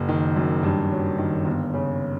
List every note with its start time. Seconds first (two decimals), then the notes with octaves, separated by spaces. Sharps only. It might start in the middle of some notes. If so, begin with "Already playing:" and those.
Already playing: F#1
0.09 D#3
0.36 F#2
0.63 G2
0.91 F#3
1.18 D#3
1.45 G1
1.74 C#3